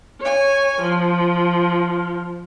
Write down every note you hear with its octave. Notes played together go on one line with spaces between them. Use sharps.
C#5 G#5
F3